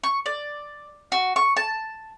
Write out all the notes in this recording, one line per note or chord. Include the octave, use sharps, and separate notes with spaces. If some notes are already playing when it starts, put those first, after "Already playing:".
C#6
D5
F#4
C#6
A5